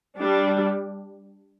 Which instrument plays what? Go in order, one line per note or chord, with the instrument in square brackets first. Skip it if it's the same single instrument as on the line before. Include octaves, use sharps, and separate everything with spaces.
[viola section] G3 D4